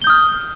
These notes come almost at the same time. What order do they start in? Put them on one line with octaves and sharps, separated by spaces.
G7 G6 D#6 F6